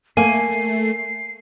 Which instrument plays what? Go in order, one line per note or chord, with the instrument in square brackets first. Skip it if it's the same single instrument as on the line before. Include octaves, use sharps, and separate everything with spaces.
[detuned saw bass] A3 [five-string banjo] A#3 [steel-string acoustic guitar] G#5 [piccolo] C7